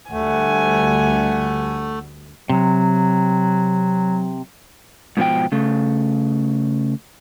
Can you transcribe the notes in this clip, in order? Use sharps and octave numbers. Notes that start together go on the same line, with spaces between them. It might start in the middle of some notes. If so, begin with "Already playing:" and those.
D2 D3 G3 A3 F#5 G#5
C3 F#3
G#2 B2 F3 G5
C#3 A3